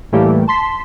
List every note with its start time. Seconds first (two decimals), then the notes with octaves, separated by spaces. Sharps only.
0.12 A2 E3 G3 A3 A#3 G4
0.48 A5 C6 B6